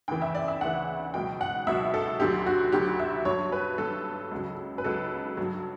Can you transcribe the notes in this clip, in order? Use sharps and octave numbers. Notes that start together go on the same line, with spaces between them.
D2 C#3 E3 G5
E5
D5
E5
D2 C#3 E3 F#5
C#2 B2 F#3 G5
F#5
C#2 B2 F#3 E5
A4
D2 D3 F#3 G4
F#4
D2 D3 F#3 G4
E5
G2 F#3 C#5
B4
G2 F#3 A4
C#2 C#3 F#3
B4
C#2 C#3 F#3 A4
G2 F#3